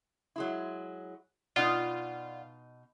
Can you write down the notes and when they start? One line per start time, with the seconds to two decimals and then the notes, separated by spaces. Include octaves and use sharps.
0.36 F#3 G#3 E4
1.56 B2 D#4 F4 D5 F#5